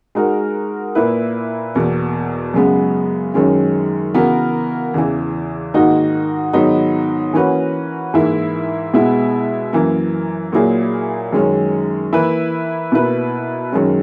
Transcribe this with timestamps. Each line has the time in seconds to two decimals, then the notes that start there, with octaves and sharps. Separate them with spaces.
0.15 G#3 D#4 F#4 A#4
0.95 A#2 A#3 E4 B4
1.75 E2 B2 A#3
2.54 F#2 C#3 G#3 B3
3.34 F#2 D#3 G#3 C#4
4.14 C#3 E3 B3 F#4 A#4
4.94 E2 C#3 E3
5.74 G#2 D#3 A#3 D#4 F#4
6.53 G#2 D#3 F#3 B3 D#4
7.33 E3 A#3 C#4 F#4 B4
8.14 G#2 E3 A#3 E4
8.94 B2 G#3 B3 E4
9.73 F#2 E3 A#3
10.53 A#2 F#3 A#3 E4 G#4
11.33 F#2 D#3 G#3 C#4
12.13 E3 A#3 E4 B4
12.92 B2 A#3 E4 B4
13.72 F#2 D#3 G#3 C#4